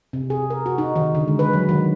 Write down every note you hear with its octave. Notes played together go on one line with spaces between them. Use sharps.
C3
G#4
A#4
F#4
D#4
D#3
D3
G#3
B4
F#3
D#3